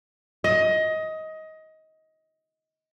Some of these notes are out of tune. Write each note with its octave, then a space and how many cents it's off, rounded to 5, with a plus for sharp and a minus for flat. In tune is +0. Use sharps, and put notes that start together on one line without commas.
D#5 +20